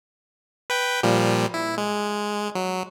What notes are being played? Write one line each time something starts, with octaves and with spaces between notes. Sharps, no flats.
B4 G5
A#2 F3 G3
E4
G#3
F#3